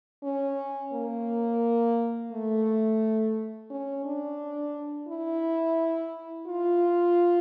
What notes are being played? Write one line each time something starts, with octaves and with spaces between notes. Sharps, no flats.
C#4
A#3
A3
C#4
D4
E4
F4